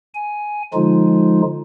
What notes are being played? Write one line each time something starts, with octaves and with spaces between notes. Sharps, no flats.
G#5
D3 F3 G#3 D#4 F4